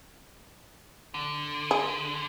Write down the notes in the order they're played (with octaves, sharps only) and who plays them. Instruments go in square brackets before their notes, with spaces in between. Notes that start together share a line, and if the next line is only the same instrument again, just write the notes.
[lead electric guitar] D3
[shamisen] G#4